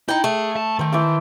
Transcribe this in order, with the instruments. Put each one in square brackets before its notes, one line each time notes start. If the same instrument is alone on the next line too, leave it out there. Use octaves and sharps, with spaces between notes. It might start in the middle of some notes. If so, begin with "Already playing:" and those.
[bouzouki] D#4 G5 [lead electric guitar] E4
[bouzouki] A3 [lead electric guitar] G#4
[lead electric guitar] A5
[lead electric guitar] D#3 [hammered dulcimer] C5 G5
[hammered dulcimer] E3 G5 A5